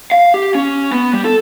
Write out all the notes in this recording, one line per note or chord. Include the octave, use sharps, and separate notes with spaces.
F5
G4
C#4
B3
G3
A4